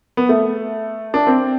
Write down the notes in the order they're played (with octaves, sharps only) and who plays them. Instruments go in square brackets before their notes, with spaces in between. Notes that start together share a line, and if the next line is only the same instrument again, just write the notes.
[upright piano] B3
A3
D4
C4